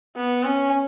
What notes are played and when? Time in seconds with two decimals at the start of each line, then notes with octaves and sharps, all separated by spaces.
0.16 B3
0.44 C#4